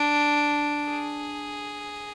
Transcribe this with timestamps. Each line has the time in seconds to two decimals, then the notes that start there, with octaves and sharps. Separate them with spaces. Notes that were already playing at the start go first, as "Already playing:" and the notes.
Already playing: D4
0.86 G#4